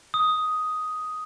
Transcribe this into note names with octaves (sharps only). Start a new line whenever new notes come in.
D#6